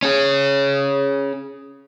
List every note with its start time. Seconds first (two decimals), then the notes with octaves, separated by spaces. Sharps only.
0.03 C#4 G#4